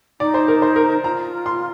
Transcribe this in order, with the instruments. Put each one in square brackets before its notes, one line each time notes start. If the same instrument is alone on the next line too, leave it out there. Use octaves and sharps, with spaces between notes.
[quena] D#4 [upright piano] D5
[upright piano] C5
A#4
C5
A#4
[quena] F4 [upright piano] A#5
[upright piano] C6